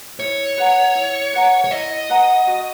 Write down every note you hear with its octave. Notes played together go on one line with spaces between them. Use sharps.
E4 C#5
B4 F#5 A#5
E4
B4 F#5 A#5
C#5
E4 D#5
B4 F#5 A#5
F#4